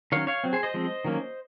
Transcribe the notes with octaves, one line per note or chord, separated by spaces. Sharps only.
D#3 F#3 C#4 C#5 F5
C#5 F5
F#3 C4
G#4 C5
C5 D#5
F3 G#3 C4
D#3 F#3 A#3 C#4